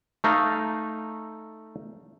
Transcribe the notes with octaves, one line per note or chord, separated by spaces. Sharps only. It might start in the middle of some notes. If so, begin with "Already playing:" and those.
A3 D#4 F5 A#5